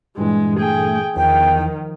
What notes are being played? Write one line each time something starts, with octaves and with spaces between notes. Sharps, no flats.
G2 A#2 E3 G#3
A3 G#4 G5
E2 D#3 F3 G5